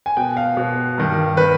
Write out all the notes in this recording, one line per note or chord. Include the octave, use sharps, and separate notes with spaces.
G#5
B2 G5
F5
B2
G2 D#3
D#3 B4